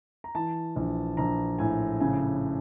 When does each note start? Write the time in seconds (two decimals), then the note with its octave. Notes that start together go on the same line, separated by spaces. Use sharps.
0.24 A#5
0.35 E3 A5
0.76 A#1
1.17 A#1 A#5
1.59 A2 G#5
2.00 C#3 G#5